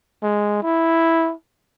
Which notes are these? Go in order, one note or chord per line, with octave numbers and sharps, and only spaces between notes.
G#3
E4